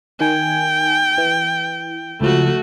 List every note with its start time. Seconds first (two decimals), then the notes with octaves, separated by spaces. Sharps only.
0.21 D#3 G5 G#5
1.18 E3
2.21 C#2 F3 A3 F#4